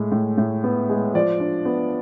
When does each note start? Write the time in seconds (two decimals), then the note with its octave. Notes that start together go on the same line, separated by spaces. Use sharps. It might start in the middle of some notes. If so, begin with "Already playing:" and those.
Already playing: A2 G#3
0.12 A2
0.38 A2
0.64 B3
0.89 G#3
1.14 F3 D5
1.40 D4
1.65 B3